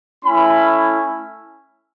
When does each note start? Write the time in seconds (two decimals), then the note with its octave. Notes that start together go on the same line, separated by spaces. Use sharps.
0.24 A3 C#4 E4 B5